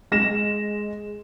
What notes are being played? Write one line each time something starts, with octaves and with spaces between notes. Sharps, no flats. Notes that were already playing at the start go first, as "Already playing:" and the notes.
G#3 A#6 E7